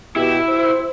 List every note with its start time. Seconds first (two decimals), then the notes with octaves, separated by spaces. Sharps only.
0.16 B2 E4 G4
0.49 C5